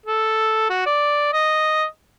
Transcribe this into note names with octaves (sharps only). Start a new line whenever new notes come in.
A4
F#4
D5
D#5